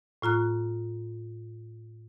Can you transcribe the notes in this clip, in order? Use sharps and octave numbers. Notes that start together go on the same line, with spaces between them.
A2 F4 A#5 F#6